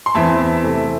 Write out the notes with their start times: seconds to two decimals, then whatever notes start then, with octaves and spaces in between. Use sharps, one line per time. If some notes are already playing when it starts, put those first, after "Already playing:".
0.06 C6
0.15 E2 E3 C4 E5 A5
0.63 C3 A3 C4